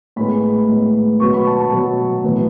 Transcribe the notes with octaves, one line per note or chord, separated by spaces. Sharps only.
A2 G#3 B3 B5
A2 G#3 B3
B2 F#3 B3 C#6
B5
A5
A5
B2 F#3 B3
A2 E3 B3